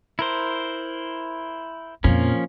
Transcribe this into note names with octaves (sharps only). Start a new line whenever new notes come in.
E4 A#4 C5
F2 A#2 F3 A#3 C#4